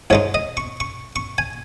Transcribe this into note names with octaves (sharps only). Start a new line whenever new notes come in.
G#2 G#3 D#4 C#5
D#5
C#6
C#6
C#6
G#5